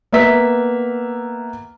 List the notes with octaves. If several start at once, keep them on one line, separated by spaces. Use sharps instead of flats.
A#3 B3 E5 B6